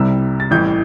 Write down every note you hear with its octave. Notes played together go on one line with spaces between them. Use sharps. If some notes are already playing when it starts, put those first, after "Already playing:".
Already playing: C2 C3 G3 E6
A6
A1 A2 E3 G3 G6